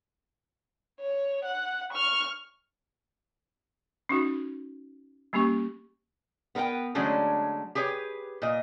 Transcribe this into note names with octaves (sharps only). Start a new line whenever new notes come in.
C#5
F#5
C#6 F6
C#4 D#4 F#4
G3 A#3 C#4 G4 C#6
B3 A#4 B4 F#5 G5
D3 F#3 G#3 A3 C#4 D4
G4 G#4 B4 C#5
A#2 D#5